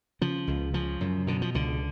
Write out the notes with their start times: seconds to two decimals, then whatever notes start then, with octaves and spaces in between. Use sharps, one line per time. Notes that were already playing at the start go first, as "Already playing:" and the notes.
0.21 C#3 F3
0.47 C#2
0.74 C#3 F3
1.01 F#2
1.27 B2 D3
1.42 F3
1.54 C#2 D3